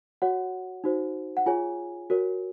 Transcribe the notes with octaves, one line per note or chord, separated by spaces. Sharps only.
F#4 C#5 F#5
D#4 F#4 C5
F#5
F4 G#4 C#5 G#5
F#4 A#4 C#5